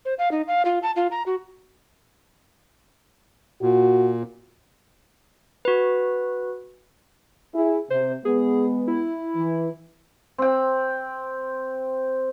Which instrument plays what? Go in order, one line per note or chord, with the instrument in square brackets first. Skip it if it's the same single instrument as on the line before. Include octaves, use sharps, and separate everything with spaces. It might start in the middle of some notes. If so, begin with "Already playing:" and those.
[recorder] C5
F5
D#4
F5
F4
A5
F4
A#5
F#4
[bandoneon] A#2 [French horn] F#4
[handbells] F#4 B4
[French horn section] E4 G#4
[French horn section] C3 [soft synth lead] C5
[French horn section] G#3 B3 [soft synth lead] G#4
[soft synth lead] E4
[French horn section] E3
[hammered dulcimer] C4 G5